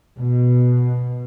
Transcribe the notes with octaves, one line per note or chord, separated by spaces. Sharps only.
B2